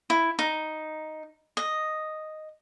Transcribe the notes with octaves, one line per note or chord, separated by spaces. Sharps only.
E4
D#4
D#5